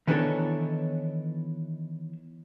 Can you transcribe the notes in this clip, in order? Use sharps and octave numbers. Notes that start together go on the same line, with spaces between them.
D#3 E3 B3 D4 A4 C#5